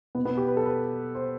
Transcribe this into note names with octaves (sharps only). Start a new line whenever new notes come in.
B2 B3
B3
G4
B4
A4
B4
C5